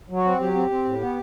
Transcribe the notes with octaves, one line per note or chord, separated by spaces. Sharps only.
F#3
F#4
C4
F#3 G4
C4
C4
A2
B3